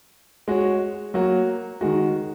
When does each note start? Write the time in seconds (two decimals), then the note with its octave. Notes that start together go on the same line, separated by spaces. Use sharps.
0.48 G#3 F#4 C#5
1.14 F#3 A#3 F#4
1.81 D#3 G#3 F#4